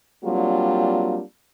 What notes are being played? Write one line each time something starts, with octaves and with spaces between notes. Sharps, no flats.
F#3 G3 A#3 C4 D4 F4